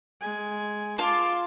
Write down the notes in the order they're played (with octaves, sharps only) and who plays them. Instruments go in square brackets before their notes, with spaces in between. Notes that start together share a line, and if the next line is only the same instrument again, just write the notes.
[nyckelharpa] G#3 G#5
[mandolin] F4 A5 [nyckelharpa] C6 D6